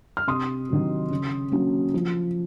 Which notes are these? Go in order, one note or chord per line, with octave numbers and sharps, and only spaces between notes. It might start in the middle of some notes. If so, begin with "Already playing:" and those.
F6
C3 C6 D#6
D#3 F#3
C#3
F#3 A#3 C#4
F3